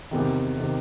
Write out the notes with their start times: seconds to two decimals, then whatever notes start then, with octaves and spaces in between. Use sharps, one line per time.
0.11 E2 C3 D#3
0.58 C3 D#3